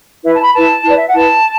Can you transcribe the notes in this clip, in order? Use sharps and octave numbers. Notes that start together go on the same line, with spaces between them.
E4 B4 E5
A5
B5
E4 B4 A5
E4 B4 D5
E5
F#5
E4 B4 A5